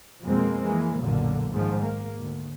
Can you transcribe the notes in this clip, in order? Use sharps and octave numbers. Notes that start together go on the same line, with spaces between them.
F2 B2 G#3 A#3 C4
E3 G#3 A#3
F#1 B1 A#2 D3 A#3
G#2 D#3 F3
A#3
D2